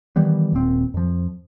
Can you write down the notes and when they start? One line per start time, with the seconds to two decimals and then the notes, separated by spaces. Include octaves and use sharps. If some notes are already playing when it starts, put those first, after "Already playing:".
0.16 D#3 E3 G3 B3
0.53 D#1 A#2 C4
0.94 F2 F3